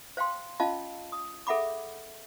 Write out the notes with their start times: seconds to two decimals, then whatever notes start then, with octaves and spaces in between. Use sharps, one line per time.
0.17 C5 F5 G5 C6
0.60 C#4 F4 D#5 F5 A5
1.12 D#6
1.47 G#4 A4 E5 F#5 B5 D6